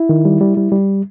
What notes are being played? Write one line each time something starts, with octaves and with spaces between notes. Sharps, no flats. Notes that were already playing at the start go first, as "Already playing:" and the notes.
Already playing: E4
D#3
G3
G3
G3
G3